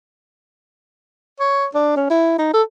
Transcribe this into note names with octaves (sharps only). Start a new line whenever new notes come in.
C#5
D4
C#4
E4
D#4
A4